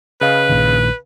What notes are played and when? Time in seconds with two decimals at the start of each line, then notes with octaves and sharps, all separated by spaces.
0.21 C#3 B4 D#5 F5
0.49 A#1 A#2 D#3